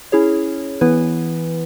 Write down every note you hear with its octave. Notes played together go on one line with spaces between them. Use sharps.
C#4 E4 G#4 C#5
E3 B3 E4 B4